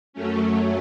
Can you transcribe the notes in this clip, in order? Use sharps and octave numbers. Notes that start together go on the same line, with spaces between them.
F#2 F#3 A3 C#4